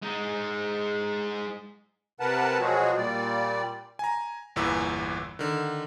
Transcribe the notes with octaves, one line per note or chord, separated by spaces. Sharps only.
G#3 D#4
C3 A#4 B4 F#5 A5
B2 F3 F#3 G#3 F#4 G#4
A#2 G3 D5
G#5 A#5
G1 E2 A#2 E3 B4 E6
D3 D#3